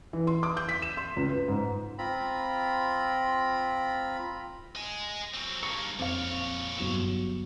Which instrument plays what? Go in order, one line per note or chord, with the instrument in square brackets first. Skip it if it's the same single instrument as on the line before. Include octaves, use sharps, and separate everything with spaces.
[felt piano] E3
C6
D6
G6
B6
E7
C6
C#2
B4
G#2
[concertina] C4 F4 A#5 B5
[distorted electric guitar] D#5 G#5
F#3 C4
[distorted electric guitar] G2 A#3 [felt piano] C#6 C#7
[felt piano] F2 F5 [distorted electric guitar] A#2 C#5
[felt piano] G1 F#3 E7